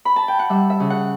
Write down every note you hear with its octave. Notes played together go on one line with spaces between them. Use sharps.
B5
A5
G5
F#5
G3 E5
E5
C#3
F#5